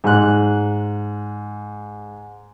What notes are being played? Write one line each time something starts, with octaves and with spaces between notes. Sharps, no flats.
G#2 F#6